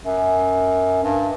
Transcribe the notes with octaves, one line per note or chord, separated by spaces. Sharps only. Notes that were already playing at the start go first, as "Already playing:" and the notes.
F#2
G2